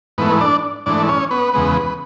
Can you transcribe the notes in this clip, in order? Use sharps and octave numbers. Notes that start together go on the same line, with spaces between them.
G#2 E3 A3 B3 B4
D4 D5
G#2 E3 A3 D4 D5
C#4 C#5
B3 B4
E2 C#3 G#3 B3